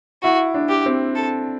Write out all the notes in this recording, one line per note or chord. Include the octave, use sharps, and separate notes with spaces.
E4 F#4
D4
G4
C4
A4